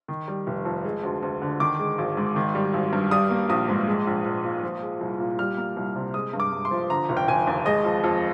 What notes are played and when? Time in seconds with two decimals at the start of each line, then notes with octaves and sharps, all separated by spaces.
0.08 D#3
0.28 G3
0.47 F1
0.65 F2
0.85 G#3
1.04 D2
1.23 D2
1.42 D3
1.60 D#3 D6
1.79 G#3
1.98 G#1
2.17 G#2
2.36 D#3
2.55 G3
2.73 G#1
2.93 G2
3.11 G3 D#6
3.31 A#3
3.49 A#1 D#6
3.69 G#2
3.87 G#3
4.07 A#1
4.25 A#1
4.44 A#2
4.63 F3
4.82 G#3
5.01 C2
5.20 A#2
5.39 G3 F6
5.57 A#3
5.77 C2
5.96 C3
6.14 G#3 D#6
6.33 G2
6.40 D6
6.52 G2
6.65 C6
6.71 F3
6.90 D3 A#5
7.09 F1
7.17 G5
7.28 F1 G#5
7.47 D#2
7.66 G#3 D#5
7.85 F2
8.04 F2